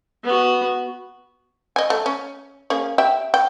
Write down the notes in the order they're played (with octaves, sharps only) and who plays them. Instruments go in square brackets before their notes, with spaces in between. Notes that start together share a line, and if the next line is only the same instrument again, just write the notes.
[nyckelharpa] B3 F#4
[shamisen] D#5 G#5
A3
C#4
A#3 C#4 G#4
G4 E5 G5
G5